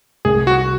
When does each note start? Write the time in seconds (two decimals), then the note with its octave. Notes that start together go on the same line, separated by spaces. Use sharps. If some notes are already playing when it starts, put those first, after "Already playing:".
0.25 C2 G#4
0.47 F#4